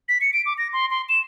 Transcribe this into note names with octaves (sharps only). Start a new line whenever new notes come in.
B6
C#7
D7
D6
A#6
C6
C6
E7